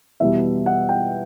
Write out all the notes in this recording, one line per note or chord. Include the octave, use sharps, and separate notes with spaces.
E2 B2 G3 E5
F#5
G5